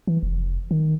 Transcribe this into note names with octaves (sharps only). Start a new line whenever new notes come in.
E3
F1
D#3